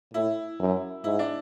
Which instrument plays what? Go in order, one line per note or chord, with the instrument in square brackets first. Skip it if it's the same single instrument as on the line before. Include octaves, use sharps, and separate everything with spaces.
[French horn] A2 [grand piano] E4
[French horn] F#2
[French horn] G#2 [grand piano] E4
[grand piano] D4